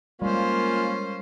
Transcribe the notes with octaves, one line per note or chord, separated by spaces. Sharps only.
G3 G#3 A#3 C#4 F4 C5